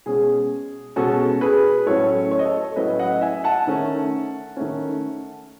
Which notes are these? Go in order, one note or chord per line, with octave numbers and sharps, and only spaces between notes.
B2 G#3 C#4 G#4
B2 G#3 C#4 F#4 A4
G#4 B4
A2 F#3 A3 C#4 A4 C#5
C#5
D#5
A4 C#5
A2 F#3 A3 C#4 B4 D#5
D#5 F#5
E5 G#5
F#5 A5
D#3 A3 C#4
D#3 A3 C#4